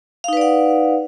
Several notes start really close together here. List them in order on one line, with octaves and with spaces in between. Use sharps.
F5 D#4 B4 D5 F#5